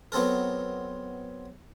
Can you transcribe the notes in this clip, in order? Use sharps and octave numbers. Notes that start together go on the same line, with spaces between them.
F#3 B3 C4 A4 A#4